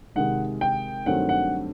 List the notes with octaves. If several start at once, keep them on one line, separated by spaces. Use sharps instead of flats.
C3 D#3 G#3 F#5
G5
G2 D#3 F#3 A3 C4 F#5
F#5